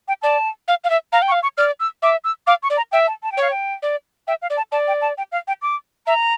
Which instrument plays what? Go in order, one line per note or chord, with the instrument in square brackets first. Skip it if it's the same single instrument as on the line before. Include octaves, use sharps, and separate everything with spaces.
[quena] G5
[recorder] D5 [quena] A5
[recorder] F5
F5
E5
[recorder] F5 [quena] A#5
[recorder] G5
[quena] C#6
[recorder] F5
[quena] C#6
[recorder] D5 [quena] F6
[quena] E6
[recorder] E5 [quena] D6
[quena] E6
[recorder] F5 [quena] D6
[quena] C#6
[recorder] D5
[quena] A#5
[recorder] E5 [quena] G5
[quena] A5
A5
G5
[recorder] C#5 [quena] F5
[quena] G5
[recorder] D5
[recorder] E5 [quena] G5
[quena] F5
[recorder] D5
[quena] A5
[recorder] D5 [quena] A5
[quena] G5
A5
G5
F5
G5
D6
[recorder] E5 [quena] A#5